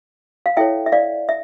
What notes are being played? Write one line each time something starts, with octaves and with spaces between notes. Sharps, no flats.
F5
E4 A4 C#5 E5 G5
E5
D5 F5
E5